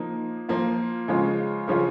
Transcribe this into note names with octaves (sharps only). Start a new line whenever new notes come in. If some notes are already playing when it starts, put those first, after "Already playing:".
Already playing: F3 A#3 D#4
F3 A#3 F4
C#3 F3 G#3 F4
C#3 F3 C#4 F4